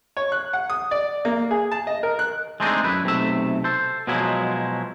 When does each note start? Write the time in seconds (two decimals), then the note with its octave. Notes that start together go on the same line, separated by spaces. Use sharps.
0.17 C#5
0.32 F#6
0.53 F#5
0.70 D#6
0.91 D5
1.25 A#3
1.51 G#4
1.72 A5
1.87 D#5
2.03 A#4
2.19 F#6
2.60 G#3 A3 C4 D4 D#4 G#4
2.84 F#2 E4 B4
3.04 B1 C3 A3 E5
3.64 A4 C5
4.07 B2 F3 F#3 G#3 E4